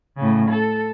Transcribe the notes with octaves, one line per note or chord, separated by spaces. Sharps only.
A2 C#3
A4